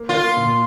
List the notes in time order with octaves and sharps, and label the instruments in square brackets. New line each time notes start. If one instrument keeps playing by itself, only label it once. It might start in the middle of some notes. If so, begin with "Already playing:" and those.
Already playing: [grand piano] A#3
[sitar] F4
[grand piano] A#3
A#2